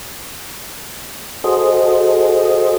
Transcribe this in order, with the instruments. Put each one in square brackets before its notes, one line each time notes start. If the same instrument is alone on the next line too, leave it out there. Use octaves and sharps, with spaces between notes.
[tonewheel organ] F#4 G#4 A4 C5 D#5